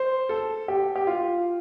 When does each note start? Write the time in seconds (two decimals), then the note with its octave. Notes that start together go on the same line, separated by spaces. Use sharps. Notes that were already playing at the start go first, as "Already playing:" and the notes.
Already playing: C5
0.29 A4
0.68 G4
0.96 G4
1.07 F4